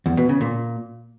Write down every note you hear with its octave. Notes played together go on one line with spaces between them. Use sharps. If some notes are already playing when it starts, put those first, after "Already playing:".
E2
B2
C#3
A#2